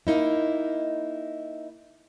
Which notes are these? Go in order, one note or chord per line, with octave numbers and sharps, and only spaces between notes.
A#3 D#4 E4